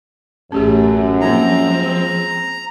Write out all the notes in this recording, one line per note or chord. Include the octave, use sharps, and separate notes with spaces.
A1 F#2 A3 C#4 G4 G#4
F3 G#3 A#3 C4 C#4 D#4 A#5